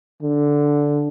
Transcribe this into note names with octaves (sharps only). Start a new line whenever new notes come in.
D3